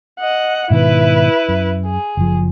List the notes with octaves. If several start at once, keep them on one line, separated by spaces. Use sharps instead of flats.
D#5 F#5
G#2 B2 D#3 E4 B4
F#2
G#4
F#1 F3